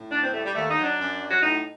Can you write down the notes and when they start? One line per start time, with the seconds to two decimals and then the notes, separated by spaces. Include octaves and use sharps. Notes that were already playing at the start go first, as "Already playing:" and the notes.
Already playing: A2
0.11 D2 D4
0.22 C4
0.33 G3 A3
0.43 G3
0.55 D#2 A3
0.70 D#4
0.77 F#3
0.84 D4
0.98 F#2
1.21 F#3
1.31 F#4
1.42 A2 D#4